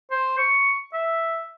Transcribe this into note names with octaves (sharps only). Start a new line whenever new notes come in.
C5
C#6
E5